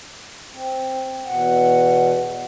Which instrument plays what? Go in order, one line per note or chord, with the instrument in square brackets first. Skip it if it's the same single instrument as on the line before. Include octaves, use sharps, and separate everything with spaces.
[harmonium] C4
[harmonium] E2 B2 [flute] F#5